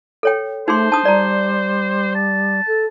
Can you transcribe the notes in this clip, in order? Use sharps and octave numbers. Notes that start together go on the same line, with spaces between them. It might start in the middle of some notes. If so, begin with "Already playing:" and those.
A4 C#5 G5
A3 D#4 G#4 C5 C6
D4 A5 D#6
G3 D5 A#5
A5
A4